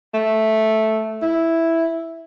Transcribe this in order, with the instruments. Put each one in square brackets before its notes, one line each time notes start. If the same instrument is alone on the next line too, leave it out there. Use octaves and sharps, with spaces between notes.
[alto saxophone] A3
E4